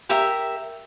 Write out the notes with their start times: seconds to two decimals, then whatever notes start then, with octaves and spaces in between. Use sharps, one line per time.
0.09 G4 A#4 E5